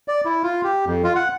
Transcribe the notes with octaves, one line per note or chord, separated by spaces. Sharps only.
D5
E4
F4
G4
F2
F4
F#5